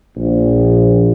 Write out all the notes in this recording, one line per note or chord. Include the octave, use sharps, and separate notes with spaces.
A#1